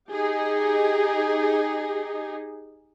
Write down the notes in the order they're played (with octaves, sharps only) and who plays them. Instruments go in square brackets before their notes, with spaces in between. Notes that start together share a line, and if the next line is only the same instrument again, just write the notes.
[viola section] D#4 G4 G#4